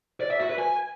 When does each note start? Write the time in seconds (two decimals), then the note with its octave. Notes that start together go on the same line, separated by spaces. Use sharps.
0.21 D5
0.30 E5
0.40 F#4
0.49 B4
0.58 G#5